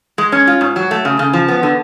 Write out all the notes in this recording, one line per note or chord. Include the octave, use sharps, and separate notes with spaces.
G#3
C#4
F4
G#2
F#3
A3
C#3
C#3
F3
B3
D3